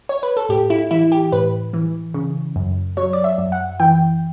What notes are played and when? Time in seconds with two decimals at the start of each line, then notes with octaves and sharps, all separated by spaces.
0.09 C#5
0.23 B4
0.37 A4
0.49 A2 G4
0.70 E4
0.91 E3 E4
1.12 G4
1.32 A2 B4
1.73 E3
2.14 C#3
2.56 F#2
2.97 F#3 C#5
3.13 D5
3.24 E5
3.38 F#2
3.52 F#5
3.80 E3 G5